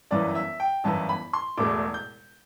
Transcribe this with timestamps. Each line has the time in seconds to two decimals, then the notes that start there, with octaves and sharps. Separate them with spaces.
0.11 G1 F#2 E3 B3 E4 D5
0.35 E5
0.60 G5
0.84 G1 F#2 E3 B3 E4 A5
1.09 B5
1.33 C6
1.58 E1 E2 B2 A3 D6
1.94 G6